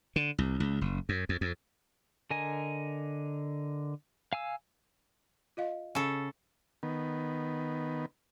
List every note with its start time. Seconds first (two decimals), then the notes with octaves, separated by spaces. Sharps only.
0.16 D3
0.38 C2
0.60 C#2
0.81 F#1
1.09 F#2
1.29 F2
1.41 F2
2.31 D3 A#4 D#5 G#5
4.33 F5 G#5 E6
5.57 F4 D#5 F5
5.95 C#3 A4
6.83 D#3 B3